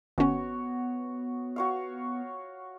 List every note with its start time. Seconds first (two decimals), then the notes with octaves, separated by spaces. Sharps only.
0.18 G#1 B3 C#4 F#4 C#5
1.56 F#4 C#5 F5